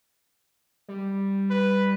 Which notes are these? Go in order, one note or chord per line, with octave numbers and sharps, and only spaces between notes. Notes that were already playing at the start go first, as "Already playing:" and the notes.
G3
B4